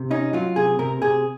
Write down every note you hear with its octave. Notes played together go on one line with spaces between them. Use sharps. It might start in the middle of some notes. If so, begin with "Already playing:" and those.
Already playing: C3
C#4 D#4
F#3 F4
C3 G#4
C3 A#4
C3 G#4